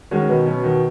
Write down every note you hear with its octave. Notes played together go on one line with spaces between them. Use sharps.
D#3 G#3 C#4 F#4
B2 D#3
F#3 C#4
D#3